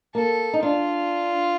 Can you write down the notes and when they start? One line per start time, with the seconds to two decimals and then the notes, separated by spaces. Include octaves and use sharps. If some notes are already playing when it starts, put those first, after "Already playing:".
0.14 A#3 A4
0.54 D#4
0.62 D4 F4